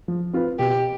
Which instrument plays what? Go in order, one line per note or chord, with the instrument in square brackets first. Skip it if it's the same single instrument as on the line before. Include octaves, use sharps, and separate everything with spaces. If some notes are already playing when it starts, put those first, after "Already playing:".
[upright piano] F3
C4 F4 B4
[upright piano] B2 [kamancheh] G4